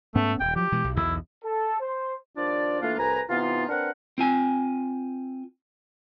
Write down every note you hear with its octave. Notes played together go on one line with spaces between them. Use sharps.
G#2 A3 B3 C#4
D#1 G5
F3 F#3 G4
B2 E3 G#3
B1
B1 E2 E4
A4
C5
D#2 F3 D4 F4 D5
E3 A3 A#3 D4 F4
C2 A2 B4 G#5 A#5
C3 E3 B3 D#4 F4
C4 D4 A#4 B4 F#5
C4 F4 G#5